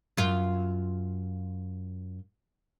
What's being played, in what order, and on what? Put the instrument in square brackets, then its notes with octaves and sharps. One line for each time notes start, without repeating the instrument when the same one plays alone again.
[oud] F#2 F4